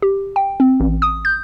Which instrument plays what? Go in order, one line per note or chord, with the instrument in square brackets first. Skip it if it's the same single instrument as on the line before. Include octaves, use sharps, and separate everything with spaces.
[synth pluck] G4
G5
C4
A1
D#6
G6